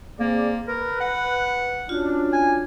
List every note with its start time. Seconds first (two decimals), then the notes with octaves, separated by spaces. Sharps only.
0.19 A#3 C4 G#4 D5
0.68 A#4 B4
1.00 F#5
1.89 C#4 D4 F4 F#4
2.33 G#5